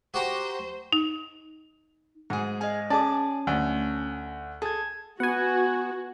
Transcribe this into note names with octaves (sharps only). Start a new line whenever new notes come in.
F#4 G4 C5 A#5
D#4
G#2 F#4 G#4
G#4 D#5 F5 G#5
C#4 G#4 D5 G#5 A5 D6
D2
G#4 A4 A5 G#6
B3 F#4 F#5 G#5